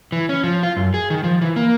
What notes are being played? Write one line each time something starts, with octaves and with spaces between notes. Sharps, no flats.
E3
C#4
F3
F4
F#2
G#4
D#3
F3
E3
A#3